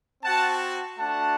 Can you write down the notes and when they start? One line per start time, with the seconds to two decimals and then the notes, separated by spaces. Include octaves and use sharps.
0.23 C4 F#4 F#5 A5
0.98 A3 D4 F#4 F#5 A5